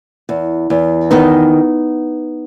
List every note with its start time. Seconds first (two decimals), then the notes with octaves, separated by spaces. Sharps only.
0.29 E2
0.70 E2
1.11 D#3 B3 D#4